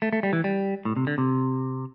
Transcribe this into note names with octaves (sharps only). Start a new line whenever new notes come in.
A3
A3
G3
E3
G3
A2
C3
D3
C3